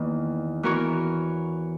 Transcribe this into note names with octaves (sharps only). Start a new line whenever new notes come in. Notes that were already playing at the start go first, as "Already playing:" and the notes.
Already playing: E2 D#3 A#3
E3 B3 F#4 A#4 C#5